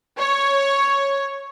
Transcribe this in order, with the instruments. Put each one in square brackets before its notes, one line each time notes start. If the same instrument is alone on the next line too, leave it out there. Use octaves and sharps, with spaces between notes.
[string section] C#5